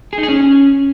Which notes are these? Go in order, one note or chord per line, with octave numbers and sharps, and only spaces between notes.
G#4
D#4
G#4
C#4